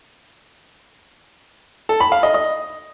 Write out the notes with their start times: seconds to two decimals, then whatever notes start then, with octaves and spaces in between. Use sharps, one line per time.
1.89 A4
2.00 B5
2.12 F5
2.23 D#5
2.34 D#5